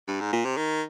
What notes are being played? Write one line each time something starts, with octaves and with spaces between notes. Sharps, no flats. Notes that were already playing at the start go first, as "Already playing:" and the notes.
G2
G#2
A#2
C3
D#3